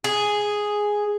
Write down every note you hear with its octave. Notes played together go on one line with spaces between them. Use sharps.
G#4